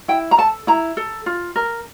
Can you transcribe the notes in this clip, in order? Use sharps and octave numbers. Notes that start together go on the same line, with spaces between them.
E4 G5
A#5
A4 A5
E4 A#5
A4
F4
A#4